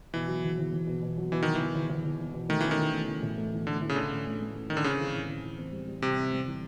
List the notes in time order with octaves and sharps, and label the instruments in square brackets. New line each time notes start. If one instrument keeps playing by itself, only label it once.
[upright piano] B2 [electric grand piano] E3
[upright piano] F#3
E2
E2
E2
B2
B2
F#3
[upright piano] B2 [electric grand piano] E3
[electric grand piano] D#3 [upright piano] F#3
[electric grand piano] E3
[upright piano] E2
E2
E2
E2
E2
B2
[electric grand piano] D#3 [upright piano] A3
[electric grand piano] E3 [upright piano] C#4
[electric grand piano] D#3
[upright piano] E3
A3
E3
A2
A3
E3
[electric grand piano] D3 [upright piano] A3
[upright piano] E3
[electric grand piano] C#3
[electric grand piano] D3 [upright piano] C#4
[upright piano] A2
A3
A3
C#4
[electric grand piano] D#3 [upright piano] C#4
[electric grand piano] D3
[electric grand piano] C#3 [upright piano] C4
[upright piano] E3
A2
E3
E3
C4
G3
G3
[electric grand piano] C3 [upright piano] C4
[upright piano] C4
G3
E3